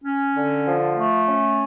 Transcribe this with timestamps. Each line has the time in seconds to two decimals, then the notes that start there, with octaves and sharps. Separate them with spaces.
0.04 C#4
0.35 D3
0.65 F3
0.97 A3
1.28 C#4